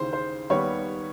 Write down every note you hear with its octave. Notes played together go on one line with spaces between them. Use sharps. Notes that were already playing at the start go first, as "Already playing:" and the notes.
Already playing: D#2 C#3 E3 C5
C5
D#2 D#3 G3 B3 C#5